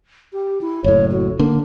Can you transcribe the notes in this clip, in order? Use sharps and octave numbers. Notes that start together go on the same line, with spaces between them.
G4
E4
F#1 A2 C#5
F#4
D3 A#3 D4